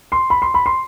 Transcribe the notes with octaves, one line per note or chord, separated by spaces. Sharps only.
C6
B5
C6
B5
C6